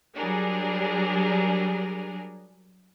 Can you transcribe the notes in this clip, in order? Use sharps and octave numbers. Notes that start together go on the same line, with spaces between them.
F#3 G3 D4 G#4 A#4